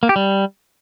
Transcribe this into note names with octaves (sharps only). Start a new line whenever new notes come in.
A#3
G4
G3